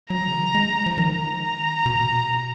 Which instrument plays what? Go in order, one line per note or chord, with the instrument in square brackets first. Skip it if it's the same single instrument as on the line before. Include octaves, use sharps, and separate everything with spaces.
[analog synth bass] F#3 [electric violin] A#5
[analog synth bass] C#3
D#3
G#3
F3
[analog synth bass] D#3 [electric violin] A#5
[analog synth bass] B2
A#2
B2